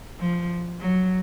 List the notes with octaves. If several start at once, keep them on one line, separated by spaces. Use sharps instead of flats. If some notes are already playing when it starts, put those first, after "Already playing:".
F3
F#3